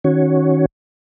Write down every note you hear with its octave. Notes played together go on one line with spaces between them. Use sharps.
D#3 C#4 F#4 C#5